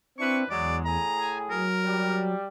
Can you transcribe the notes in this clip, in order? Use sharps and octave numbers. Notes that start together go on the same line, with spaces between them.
C4 D4 E4 B4 C#6
E2 F#3 G#3 D5
A2 G#4 A#5
G#5
F#3 A#4
G3